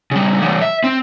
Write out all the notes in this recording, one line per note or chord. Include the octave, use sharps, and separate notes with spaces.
C#3 G3
E3 G3
E5
C4